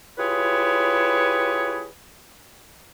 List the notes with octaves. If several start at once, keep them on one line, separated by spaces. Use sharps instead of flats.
E4 F4 G4 G#4 B4 C#5